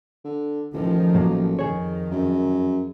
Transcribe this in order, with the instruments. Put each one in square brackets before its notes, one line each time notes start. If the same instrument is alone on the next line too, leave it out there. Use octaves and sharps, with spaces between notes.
[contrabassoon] D3
[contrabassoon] A1 [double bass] D#3 F3
[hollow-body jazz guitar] A2 F#3 A#3
[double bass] F2 D#3 [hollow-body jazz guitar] G#4 C#5
[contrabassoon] F#2